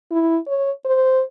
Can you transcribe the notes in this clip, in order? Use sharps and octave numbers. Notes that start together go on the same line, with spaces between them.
E4
C#5
C5